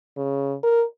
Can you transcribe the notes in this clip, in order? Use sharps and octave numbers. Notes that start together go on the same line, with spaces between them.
C#3
A#4